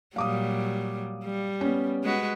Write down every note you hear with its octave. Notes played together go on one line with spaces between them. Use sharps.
A#2 F#3 G3 F5 D6 D#6
G3
B3 C#4
G#3 F#4 B4